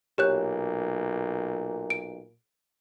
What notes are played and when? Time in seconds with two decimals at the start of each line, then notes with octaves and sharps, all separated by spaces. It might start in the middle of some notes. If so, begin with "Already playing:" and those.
0.18 B1 A#2 G4 C#5 F#6
1.90 D7